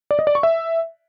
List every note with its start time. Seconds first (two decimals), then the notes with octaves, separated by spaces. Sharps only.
0.11 D5
0.19 D#5
0.27 D5
0.35 C#6
0.43 E5